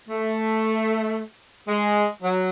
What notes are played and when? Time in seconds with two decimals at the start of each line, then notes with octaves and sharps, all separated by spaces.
0.09 A3
1.68 G#3
2.22 F#3